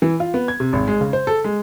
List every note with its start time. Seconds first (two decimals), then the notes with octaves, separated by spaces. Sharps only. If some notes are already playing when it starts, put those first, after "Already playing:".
0.02 E3
0.20 F4
0.34 B3
0.48 G#6
0.60 C3
0.73 G#1
0.88 G#3
1.01 C#3
1.13 C5
1.27 A4
1.44 G#3